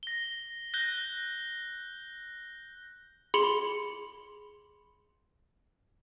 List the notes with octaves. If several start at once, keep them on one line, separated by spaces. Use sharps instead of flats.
A#6 G7
F#6 G6 A#6 G7
G#4 B5 C6 C#7 F#7 G7